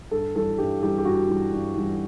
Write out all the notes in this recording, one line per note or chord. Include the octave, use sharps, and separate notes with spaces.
G2 A4
E3 G3 A4
G2 G4
E3 G3 G4
G4
G2 F#4
E3 G3
G2
E3 G3